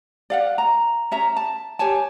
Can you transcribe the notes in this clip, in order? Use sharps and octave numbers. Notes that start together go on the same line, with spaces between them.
D5 F5 F#5
A#5
C#4 E5 A#5
A5
G4 C#5 G#5 A5